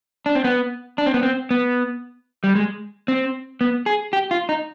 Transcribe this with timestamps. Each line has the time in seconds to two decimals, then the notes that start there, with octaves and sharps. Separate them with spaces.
0.26 D4
0.35 C4
0.44 B3
0.98 D4
1.06 C4
1.14 B3
1.23 C4
1.51 B3
2.44 G3
2.55 G#3
3.08 C4
3.61 B3
3.86 G#4
4.13 G4
4.31 F4
4.49 D#4